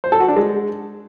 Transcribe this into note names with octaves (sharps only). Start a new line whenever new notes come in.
C5
A4
F#4
D4
G#3